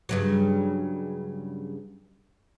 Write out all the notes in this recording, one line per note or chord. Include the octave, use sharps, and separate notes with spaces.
G2 C#3 F#3